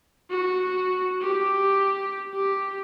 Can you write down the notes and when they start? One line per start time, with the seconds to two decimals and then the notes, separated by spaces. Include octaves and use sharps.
0.30 F#4
1.21 G4
2.34 G4